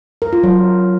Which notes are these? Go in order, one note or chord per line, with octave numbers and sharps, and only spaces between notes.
A#4
F4
F#3